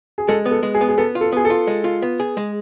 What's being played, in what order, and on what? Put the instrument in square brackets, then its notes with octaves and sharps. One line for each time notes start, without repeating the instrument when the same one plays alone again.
[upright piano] G#4
[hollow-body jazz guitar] G#3 [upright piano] A4
[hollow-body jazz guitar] B3
[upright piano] A4
[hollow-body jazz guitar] G#3
[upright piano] G#4
[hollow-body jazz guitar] B3
[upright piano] G#4
[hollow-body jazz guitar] B3 [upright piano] A4
[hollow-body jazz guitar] F4
[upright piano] A4
[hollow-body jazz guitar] B3 [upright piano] G#4
[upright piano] A4
[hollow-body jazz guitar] F4
G#3
F4
B3
G#4
G#3